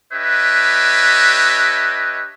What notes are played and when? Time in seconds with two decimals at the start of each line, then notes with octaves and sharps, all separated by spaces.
0.13 D4 G4 B4 C#5 D#5 E5